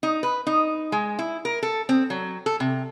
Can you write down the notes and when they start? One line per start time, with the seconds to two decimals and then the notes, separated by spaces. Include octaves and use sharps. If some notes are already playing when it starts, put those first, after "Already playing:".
0.03 D#4
0.23 B4
0.47 D#4
0.92 G#3
1.19 E4
1.45 A#4
1.63 A4
1.89 C4
2.10 F#3
2.46 A4
2.60 C3